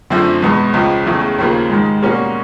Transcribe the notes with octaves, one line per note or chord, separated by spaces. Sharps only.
F#2 D3 F3 A3 C4
E2 B2 G#3 B3
C#2 C#3 F3
E2 C#3 E3 A3
D#2 C#3 F3 A#3
G#2 D#3 G#3
B2 G3 A#3 C#4 F#4